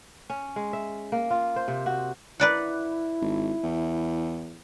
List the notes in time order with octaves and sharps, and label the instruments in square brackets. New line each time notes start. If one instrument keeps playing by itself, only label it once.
[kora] C#4
G#3
E5
A#3
F4
C5
C3
F#4
[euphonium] E4 [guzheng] B4 D5 F#5
[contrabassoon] G#1
E2